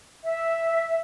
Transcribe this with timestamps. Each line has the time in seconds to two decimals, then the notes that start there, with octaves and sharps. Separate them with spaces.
0.23 E5